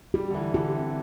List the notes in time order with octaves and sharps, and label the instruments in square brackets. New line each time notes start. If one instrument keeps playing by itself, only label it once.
[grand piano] G3 [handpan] G4
[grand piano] D3
E3
[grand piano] D3 [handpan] G4
[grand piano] C3